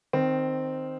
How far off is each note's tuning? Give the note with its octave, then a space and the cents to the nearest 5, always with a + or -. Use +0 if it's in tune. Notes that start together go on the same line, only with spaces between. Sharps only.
D#3 -10 C4 -5